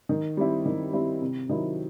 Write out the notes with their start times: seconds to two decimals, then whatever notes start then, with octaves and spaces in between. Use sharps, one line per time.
0.09 D#3
0.37 G3 C4 E4
0.66 D#3
0.93 G3 C4 E4
1.21 C3
1.49 D#3 F#3 C4 E4